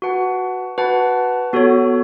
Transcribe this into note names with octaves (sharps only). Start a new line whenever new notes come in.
F#4 B4 F#5 A5
F#4 B4 F#5 A5
B3 F#4 A4 C#5